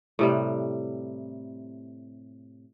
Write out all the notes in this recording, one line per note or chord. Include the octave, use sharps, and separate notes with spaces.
A2 C3 G3